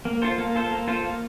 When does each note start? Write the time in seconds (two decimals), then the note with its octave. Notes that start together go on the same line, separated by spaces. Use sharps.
0.05 A#3
0.22 F4 A4 C5
0.38 A#3
0.55 F4 A4 C5
0.71 A#3
0.88 F4 A4 C5
1.04 A#3